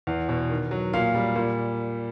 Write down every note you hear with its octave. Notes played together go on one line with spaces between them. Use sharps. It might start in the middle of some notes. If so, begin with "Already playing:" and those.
E2
B2
D#3
F#3
A#2 F5
G3
A#2